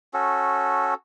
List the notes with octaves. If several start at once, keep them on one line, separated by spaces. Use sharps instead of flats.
C#4 F#4 A4